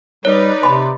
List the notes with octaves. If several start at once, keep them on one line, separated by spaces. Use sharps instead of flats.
G3 D#4 B4 C#5 D5
C3 B5 C6